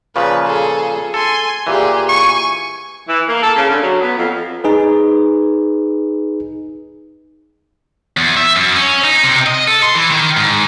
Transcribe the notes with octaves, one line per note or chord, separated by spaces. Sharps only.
A#2 C#3 F3 B4
G#4 A4
A4 G#5 C6
A#2 E3 G4 G#4
G#5 C#6
E3
A#3
A4
C#3
D3
F#3
B3
F2
D#4 G#4 B4
E2
E5
F#2
C#4
D#4
C3
D#5
A4
C6
E3
D#3
G#2